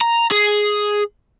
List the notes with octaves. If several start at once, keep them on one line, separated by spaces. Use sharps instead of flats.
A#5
G#4